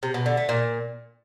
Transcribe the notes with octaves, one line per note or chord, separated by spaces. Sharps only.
C3
B2
D3
A3
A#2